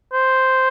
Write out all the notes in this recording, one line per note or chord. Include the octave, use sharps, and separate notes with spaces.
C5